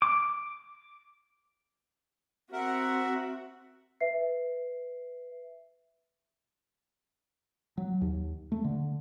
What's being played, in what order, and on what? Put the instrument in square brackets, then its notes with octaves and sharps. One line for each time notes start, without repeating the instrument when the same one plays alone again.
[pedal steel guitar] D6
[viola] C4 F#4 [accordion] A#4 E5 F#5
[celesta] B4 E5 C7
[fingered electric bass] F#3
D#2
A3
D3